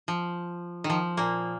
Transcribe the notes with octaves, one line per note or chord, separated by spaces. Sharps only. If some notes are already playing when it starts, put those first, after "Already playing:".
F3
D#3
F3
A#2 A#3